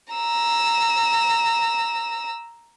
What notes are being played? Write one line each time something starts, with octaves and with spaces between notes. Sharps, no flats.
A#5 E6